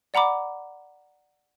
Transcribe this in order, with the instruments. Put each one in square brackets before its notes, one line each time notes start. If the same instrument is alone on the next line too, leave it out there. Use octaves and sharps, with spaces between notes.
[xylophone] D5 F#5 A#5 B5 D6